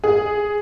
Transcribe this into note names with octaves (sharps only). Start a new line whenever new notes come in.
G#4